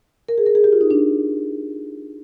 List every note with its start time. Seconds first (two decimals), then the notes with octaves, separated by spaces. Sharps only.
0.29 A#4
0.38 G#4
0.46 A#4
0.55 G#4
0.64 G4
0.73 F4
0.81 D#4
0.91 D4